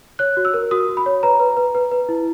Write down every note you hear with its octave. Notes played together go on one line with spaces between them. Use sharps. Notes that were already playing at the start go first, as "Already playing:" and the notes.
C#5 F#6
F#4
E6
A#4
F#4 D#6
F#4
B5
C#5
B4 A#5
B4
B4
B4
B4
E4